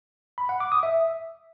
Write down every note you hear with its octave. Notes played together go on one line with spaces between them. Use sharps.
B5
F#5
D6
D#6
E5